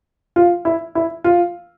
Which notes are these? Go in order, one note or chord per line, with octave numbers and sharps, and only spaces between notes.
F4
E4
E4
F4